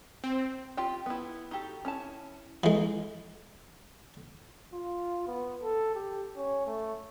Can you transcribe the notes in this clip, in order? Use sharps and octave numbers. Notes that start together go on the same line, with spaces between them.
C4
F4 G4 G5
B3 E4
D#4 F#4 G4 A4
C#4 E4 A5
E3 G#3
F4
B3
A4
G4
C#4
A3